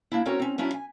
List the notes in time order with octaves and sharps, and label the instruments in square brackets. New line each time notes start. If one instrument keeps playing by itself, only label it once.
[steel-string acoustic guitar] A#3 D4 E4
C4 C#4 F#4 A#4 C#5
C4 C#4
F#3 C#4 D4 E4
G#5